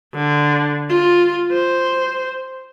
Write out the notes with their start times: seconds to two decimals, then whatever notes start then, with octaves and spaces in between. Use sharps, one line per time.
0.15 D3
0.89 F4
1.52 C5